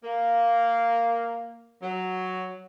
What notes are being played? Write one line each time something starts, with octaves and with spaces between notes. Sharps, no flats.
A#3
F#3